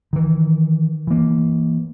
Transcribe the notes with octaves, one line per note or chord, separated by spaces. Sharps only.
D#3 E3
E3 A#3